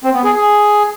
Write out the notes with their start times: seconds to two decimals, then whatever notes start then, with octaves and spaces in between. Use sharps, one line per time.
0.03 C4
0.14 B3
0.24 G#4
0.34 G#4